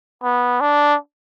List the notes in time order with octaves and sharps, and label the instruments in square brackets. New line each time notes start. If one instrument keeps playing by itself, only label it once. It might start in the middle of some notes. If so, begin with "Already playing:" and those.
[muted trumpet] B3
D4